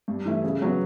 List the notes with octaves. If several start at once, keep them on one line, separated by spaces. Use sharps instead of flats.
G2
E3 A3 E4
C#3
F#3 B3